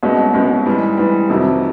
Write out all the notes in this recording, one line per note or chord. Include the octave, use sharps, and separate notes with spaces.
C2 B2 G#3 C#4
C2 B2 G#3 C#4
G#2 E3 G3
G#2 E3 G3
F2 C3 D#3 F#3